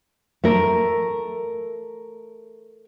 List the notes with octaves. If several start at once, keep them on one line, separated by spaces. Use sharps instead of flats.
A3 A#4